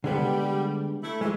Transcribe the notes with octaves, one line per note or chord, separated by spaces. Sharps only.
D3 G3 G#3 B3
A3 E4
E3 G#3